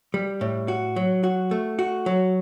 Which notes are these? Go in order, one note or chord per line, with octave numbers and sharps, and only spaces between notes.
G3
A2
F#4
F#3
F#4
A3
F#4
F#3